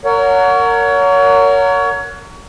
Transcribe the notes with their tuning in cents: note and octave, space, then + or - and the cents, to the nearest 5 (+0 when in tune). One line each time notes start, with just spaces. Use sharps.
A#4 -20 C#5 +25 F#5 -15